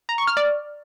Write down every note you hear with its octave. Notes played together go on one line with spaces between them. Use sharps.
A#5
C#6
F6
D5